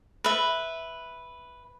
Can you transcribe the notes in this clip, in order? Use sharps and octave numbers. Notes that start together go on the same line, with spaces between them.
B4 E5